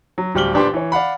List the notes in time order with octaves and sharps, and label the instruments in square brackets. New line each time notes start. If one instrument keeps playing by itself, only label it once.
[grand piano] F#3
D1 G3 G4 F6 F#7 G7
A#1 D4 G4 B4 G5 C6
E3 C#5
D5 F5 F#5 B5